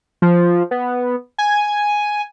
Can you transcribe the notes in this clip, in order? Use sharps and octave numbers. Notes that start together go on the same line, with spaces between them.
F3
B3
G#5